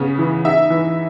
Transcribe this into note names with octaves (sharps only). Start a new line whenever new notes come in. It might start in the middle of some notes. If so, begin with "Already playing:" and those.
Already playing: C#3 B3
E3
D#4 E5
E3